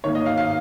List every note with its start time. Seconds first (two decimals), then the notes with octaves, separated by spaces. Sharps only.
0.04 G#2 D#3 A#3 C#5
0.15 D#5
0.26 F5
0.38 F5